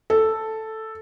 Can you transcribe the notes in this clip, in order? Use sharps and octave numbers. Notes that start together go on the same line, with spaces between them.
A4